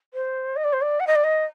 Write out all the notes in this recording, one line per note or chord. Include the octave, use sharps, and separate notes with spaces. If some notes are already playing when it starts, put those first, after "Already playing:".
C5
D#5
D5
C5
D5
F#5
D#5
D5
D#5